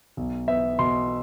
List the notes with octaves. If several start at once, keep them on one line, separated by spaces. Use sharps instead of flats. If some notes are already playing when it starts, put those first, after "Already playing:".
B1
B3 E5
B2 C6